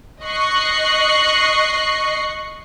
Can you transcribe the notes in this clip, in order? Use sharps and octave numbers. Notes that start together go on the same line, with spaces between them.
D#5 C#6 F#6 C7